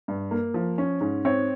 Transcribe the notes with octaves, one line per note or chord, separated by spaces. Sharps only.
G2
A#3
F3
C#4
G#2
C4 C#5